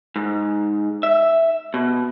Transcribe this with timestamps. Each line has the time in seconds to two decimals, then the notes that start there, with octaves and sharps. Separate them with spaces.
0.16 G#2
1.03 E5
1.74 B2